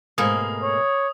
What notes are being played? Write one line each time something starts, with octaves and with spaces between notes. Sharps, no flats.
G#2 B2 A3 A#3 G#4 D#6
C#5